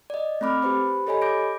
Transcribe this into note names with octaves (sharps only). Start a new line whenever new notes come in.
D5 D#5
A3 C4 B5 D6 F6
G4 B4 C5 B5
G4 A4 C#5 D#5 G#5 B5
D6 G6 A#6 D7